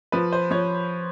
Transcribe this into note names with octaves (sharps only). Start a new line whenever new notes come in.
F3 B4
C5
F3 C#5